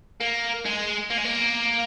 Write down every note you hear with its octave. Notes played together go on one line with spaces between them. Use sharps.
A#3
G#3
A#3
G#3
A#3